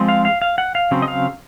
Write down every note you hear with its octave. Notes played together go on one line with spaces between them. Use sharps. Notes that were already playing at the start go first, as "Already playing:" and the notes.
Already playing: F3 G#3 C4
F5
F5
F5
F#5
F5
C#3 F#3 C4
D#5
F5